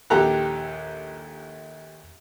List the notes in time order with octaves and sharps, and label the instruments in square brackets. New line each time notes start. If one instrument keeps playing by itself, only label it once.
[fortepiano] A#1 D#2 G4 A4 A#5 F#6